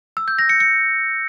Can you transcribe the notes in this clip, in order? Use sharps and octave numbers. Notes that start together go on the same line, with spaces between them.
E6
G6
A#6
C#7
C#7